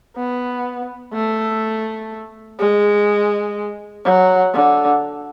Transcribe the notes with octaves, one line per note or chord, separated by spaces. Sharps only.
B3
A3
G#3
F#3
D3